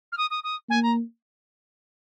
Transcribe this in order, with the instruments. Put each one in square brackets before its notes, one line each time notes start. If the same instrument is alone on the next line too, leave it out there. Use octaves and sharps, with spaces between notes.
[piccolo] F6
D#6
D#6
D#6
[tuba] A#3 [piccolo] G#5
[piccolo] A#5